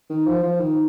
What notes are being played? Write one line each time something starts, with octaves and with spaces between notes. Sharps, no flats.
D#3
F3
F3
D#3